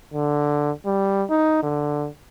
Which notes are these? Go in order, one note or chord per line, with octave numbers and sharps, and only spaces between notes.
D3
G3
D#4
D3